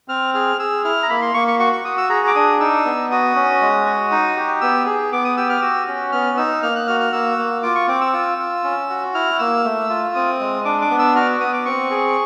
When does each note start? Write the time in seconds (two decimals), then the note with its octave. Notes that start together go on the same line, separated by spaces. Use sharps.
0.08 C4 F6
0.34 G#4 F6
0.59 G#4 E6
0.84 E4 F6
1.03 A#5
1.09 A#3 B5
1.22 C6
1.34 A#3 C#6
1.48 C#6
1.59 F#4 C#6
1.73 C#6
1.84 F#4 D#6
1.98 E6
2.09 G#4 A#5
2.27 D6
2.35 D4 D#6
2.60 D#4 E6
2.85 B3
3.11 F#4 D#6
3.35 C#4
3.61 G#3
3.86 F#4
4.11 D#4
4.36 G4
4.61 B3 E6
4.86 G#4
5.12 B3 D6
5.24 D#6
5.37 G4 E6
5.49 F6
5.62 F#4 E6
5.88 C#4
6.12 B3 F6
6.37 D#4 E6
6.63 A#3 F6
6.76 F#6
6.87 F#4 F6
7.00 F6
7.12 A#3 E6
7.38 A#3
7.63 F4 D6
7.75 C#6
7.88 C4 D6
8.01 E6
8.13 F4
8.38 F4
8.64 C#4
8.89 F#4
9.14 E4 F6
9.39 A#3 E6
9.64 A3
9.89 F4
10.15 C4 D#6
10.41 G#3
10.65 D4 D6
10.81 D6
10.90 B3
10.99 E6
11.15 F#4 F6
11.40 B3 D#6
11.53 D6
11.65 C4 C#6
11.91 G#4